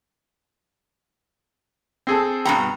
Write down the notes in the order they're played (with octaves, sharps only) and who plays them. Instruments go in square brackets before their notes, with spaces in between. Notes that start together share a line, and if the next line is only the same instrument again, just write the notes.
[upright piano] C4 G#4 A4
[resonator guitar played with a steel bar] G2 B2 A#5 [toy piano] G5 B5